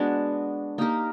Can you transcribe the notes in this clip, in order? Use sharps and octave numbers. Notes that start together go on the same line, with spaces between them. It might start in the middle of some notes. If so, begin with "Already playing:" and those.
Already playing: G#3 B3 D4 F#4
A#3 D#4 G4 A#4